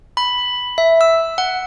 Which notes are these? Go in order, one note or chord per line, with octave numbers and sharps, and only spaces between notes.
B5
E5
E6
F#5